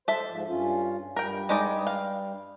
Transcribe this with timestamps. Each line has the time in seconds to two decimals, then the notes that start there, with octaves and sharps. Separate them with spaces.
0.08 A4 C5 E5
0.27 G#2 F3
0.48 G2 C#4 F4
1.16 G2 G3 A#4 G5
1.49 G#3 D#4 D5
1.87 F5